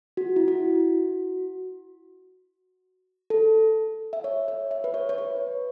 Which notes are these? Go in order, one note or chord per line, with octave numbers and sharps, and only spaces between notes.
F#4
E4
F#4
A4
E5
C#5
C#5
E5
B4
C#5
C#5
B4